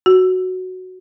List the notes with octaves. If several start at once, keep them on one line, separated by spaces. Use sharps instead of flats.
F#4